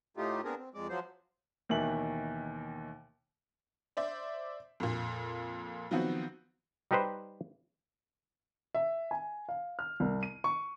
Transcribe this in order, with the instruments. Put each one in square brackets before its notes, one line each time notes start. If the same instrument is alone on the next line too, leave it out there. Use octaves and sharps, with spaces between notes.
[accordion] A2 A3 D#4 F4 G4
B3 C4 D4 G#4 A#4
C4
F2 G#3 D5
F3 F#3 C5
[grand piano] D#2 B2 D#3 E3 E5 F#7
[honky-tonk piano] C5 D5 E5
F2 A#2
D#3 F3 F#3 B3 C4 F#4
[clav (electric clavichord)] G3 D#4 G4 B4 C5
[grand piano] E5
G#5
F5
F6
C2
D#7
C#6